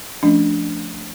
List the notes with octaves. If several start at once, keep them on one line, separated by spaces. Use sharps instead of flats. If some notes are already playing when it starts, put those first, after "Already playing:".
F3 A3 C#4 D4